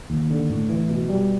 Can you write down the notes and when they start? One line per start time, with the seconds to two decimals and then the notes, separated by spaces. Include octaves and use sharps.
0.10 D#2
0.30 D3
0.50 A2
0.69 E3
0.89 B2
1.09 G3